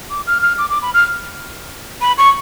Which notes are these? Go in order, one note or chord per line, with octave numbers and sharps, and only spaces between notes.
D6
F6
F6
D6
D6
B5
F6
B5
C#6